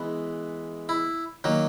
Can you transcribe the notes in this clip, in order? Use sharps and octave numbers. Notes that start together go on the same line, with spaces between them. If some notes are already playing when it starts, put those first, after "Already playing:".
Already playing: E3 G#3 B3
E4
D#3 F#3 A#3